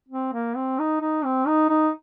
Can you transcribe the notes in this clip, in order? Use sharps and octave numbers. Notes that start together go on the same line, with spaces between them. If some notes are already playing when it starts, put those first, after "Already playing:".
C4
A#3
C4
D#4
D#4
C4
D#4
D#4